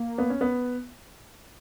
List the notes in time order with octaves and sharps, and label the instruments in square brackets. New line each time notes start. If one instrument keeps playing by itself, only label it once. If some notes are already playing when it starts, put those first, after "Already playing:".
Already playing: [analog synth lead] A#3
[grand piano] B3
C#4
B3